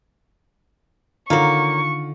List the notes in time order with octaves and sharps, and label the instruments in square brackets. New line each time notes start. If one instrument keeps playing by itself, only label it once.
[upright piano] D3 [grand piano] D#3 F4 [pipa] F#3 A#3 [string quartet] C#6